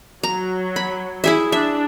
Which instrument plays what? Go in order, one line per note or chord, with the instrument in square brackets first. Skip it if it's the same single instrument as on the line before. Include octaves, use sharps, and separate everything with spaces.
[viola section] F#3 [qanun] A#5
[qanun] B5
E4 G#4 E5
[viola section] D4 [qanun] E5